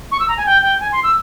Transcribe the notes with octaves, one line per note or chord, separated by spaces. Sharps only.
C#6
E6
A#5
G#5
G5
G5
G#5
C6
E6